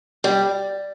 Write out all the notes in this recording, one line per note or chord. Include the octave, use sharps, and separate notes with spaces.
G3